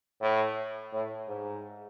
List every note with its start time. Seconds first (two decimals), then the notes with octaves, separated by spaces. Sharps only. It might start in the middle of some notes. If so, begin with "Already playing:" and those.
0.21 A2
0.93 A2
1.28 G#2